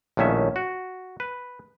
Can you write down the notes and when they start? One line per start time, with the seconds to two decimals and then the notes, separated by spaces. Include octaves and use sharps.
0.17 A#1 A2 D#3 C#4 E5
0.56 F#4
1.20 B4